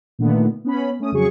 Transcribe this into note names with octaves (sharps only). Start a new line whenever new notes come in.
A#2 D3 D#3 A3 B3
B3 C#4 B5
A3 C#4 D#6
F2 C#3 F#3 G#4 C#6